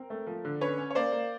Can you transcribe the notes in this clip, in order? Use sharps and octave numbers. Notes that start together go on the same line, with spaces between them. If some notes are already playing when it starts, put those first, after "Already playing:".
Already playing: C4 A#4
A3
F3
D3
C#4 B4 C#5
C#4
C#5
A#3 C5 D5
A#3